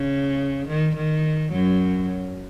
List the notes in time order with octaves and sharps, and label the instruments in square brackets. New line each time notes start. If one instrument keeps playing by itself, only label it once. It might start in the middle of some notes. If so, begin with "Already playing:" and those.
Already playing: [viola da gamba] C#3
D#3
D#3
F#2 F#3